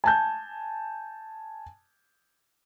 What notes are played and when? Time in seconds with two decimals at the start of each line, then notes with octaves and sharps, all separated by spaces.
0.04 G#5 A5 G6